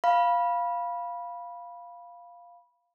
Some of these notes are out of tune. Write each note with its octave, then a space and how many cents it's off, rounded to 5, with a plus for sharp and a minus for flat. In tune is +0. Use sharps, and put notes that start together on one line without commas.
F5 +0 B5 -15